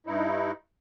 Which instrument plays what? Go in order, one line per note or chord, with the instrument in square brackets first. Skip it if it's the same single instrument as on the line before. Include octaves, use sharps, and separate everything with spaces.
[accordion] G2 D#4 E4